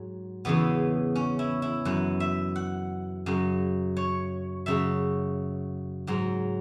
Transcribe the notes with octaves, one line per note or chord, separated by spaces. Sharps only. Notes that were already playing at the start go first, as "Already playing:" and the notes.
Already playing: G#2 F#3
E2 C#3 E3 B3
C#4
E4
E4
F#2 E3 F#5
E5
F#5
F#2 C#3 F#3
C#5
F#2 C#3 F#3 E5
G#2 F#3